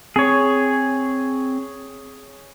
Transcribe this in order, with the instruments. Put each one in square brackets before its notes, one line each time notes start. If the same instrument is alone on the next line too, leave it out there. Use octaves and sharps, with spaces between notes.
[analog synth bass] C4 [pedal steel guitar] G#4 C#5